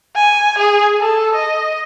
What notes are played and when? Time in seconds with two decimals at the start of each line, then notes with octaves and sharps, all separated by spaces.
0.16 G#5
0.58 G#4
1.00 A4
1.35 D#5